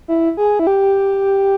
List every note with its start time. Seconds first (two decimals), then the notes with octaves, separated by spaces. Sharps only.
0.08 E4
0.37 G#4
0.59 E4
0.67 G4